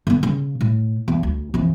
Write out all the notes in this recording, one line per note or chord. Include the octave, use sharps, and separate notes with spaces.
D3 B3
C#3
A2
E2
D2
F2 E3